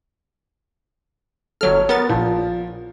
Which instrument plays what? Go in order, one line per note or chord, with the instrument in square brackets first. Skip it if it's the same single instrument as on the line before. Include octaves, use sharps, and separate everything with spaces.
[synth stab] G1 F#3 F6 [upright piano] A4 C#5
[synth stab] B3 A6 [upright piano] A#4
[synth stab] A#1 A#2 [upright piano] F3